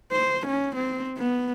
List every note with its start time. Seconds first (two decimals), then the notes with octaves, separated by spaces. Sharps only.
0.12 C5
0.47 C#4
0.76 C4
1.18 B3